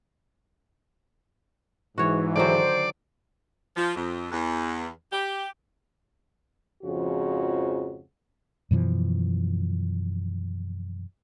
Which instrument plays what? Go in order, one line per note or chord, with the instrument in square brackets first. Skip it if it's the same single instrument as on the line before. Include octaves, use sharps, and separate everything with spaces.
[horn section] G#2 E3 [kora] F#4 C#5
[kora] D3 D#3 F#3 [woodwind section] C5 [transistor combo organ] D5
[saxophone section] F3
F2
E2
G4
[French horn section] F2 G#2 C#3 F3 F#4
[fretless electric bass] F#2 B2 E3 F3